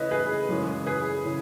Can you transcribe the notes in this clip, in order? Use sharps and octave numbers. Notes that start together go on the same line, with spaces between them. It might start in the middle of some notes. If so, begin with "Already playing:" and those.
Already playing: C#3 E3 A3 C#4 B4 C#5 D#5 E5
G#4 B4
F#2 C#3 E3 G#3 C#4
G#4 B4
C#3 E3